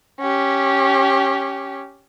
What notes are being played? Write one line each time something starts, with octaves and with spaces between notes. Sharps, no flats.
C#4 G4